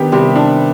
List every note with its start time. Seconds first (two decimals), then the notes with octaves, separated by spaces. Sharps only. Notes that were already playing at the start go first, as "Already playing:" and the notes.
Already playing: D#3 B3 D4 G4
0.12 C3 G3
0.36 D4